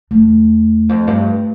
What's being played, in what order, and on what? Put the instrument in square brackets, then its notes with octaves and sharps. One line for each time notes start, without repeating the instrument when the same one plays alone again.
[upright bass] E2 [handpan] A3
[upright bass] F2
G2